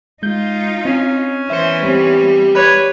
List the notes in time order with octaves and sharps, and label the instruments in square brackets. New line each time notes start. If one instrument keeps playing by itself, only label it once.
[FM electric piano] G#3 G6 [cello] D#4 F4
[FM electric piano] C4 [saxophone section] C#4
[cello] E3 B3 [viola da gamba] C5 [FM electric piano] E5 C#7
[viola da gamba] G3 [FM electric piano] C4 C5
[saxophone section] B4 C#5 [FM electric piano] D5